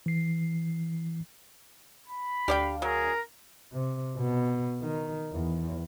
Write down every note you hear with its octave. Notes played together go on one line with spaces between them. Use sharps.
E3 C7
B5
D2 D4 G4 D5 F5 G5
F#3 G#4 A#4
C3
B2
D#3
E2